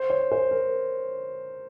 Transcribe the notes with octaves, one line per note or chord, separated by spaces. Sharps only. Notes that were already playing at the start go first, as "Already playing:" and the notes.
Already playing: C5
C#5
C5
A#4